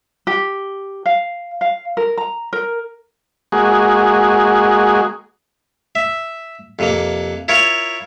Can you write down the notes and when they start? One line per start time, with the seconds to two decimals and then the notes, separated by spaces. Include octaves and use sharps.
0.27 G4
1.06 F5
1.61 F5
1.97 A#4
2.18 A#5
2.53 A#4
3.52 G#3 A#3 F#4 G#4
5.95 E5
6.79 F2 C3 A#3
7.48 E4 F4 A#4 C#5